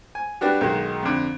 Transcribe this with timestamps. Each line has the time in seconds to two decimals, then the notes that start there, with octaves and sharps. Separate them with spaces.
0.15 G#5
0.41 G3 B3 D4 F#4 G4
0.61 B1 D#3 G#3 F#4
1.03 F2 D3